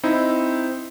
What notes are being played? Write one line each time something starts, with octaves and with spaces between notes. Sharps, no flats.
C4 D#4 E4